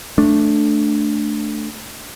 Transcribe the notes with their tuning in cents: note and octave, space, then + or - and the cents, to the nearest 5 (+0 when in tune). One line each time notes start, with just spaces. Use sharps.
A3 +0 D4 +0